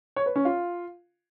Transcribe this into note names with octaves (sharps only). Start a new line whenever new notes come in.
C#5
B4
C#4
F4